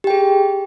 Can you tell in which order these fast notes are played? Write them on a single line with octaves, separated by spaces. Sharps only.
G4 G5 G#4